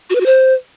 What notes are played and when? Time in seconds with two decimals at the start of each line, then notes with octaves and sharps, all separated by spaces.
0.10 F#4
0.15 B4
0.21 F#4
0.26 C5